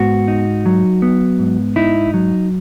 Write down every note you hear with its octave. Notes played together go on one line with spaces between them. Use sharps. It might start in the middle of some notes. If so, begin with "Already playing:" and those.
Already playing: G#2 B3 F#4
D#4
F#3
B3
G#2
D#4 E4
F#3